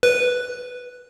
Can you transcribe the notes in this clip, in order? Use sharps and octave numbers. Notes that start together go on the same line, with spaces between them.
B4